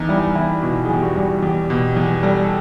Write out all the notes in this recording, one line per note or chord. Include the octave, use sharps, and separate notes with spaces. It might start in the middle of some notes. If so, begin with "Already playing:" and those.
Already playing: E2 D#4
G3 E4
E2 E4
B2 F#4
G#4
E2 G4
F#4
G3
E2 G4
B2
E2
G3 A4
A4